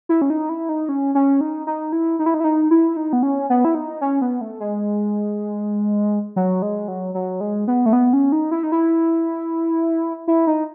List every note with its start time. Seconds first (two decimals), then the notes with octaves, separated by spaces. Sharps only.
0.09 E4
0.22 C#4
0.30 D#4
0.49 E4
0.69 D#4
0.89 C#4
1.15 C#4
1.41 D#4
1.67 D#4
1.92 E4
2.19 D#4
2.26 E4
2.34 D#4
2.40 E4
2.44 D#4
2.71 E4
2.97 D#4
3.13 B3
3.23 C#4
3.50 B3
3.65 E4
3.75 D#4
4.01 C#4
4.22 B3
4.41 A3
4.60 G#3
6.36 F#3
6.62 G#3
6.88 F#3
7.14 F#3
7.41 G#3
7.68 B3
7.86 A3
7.93 B3
8.13 C#4
8.32 D#4
8.51 E4
8.63 D#4
8.72 E4
10.28 E4
10.47 D#4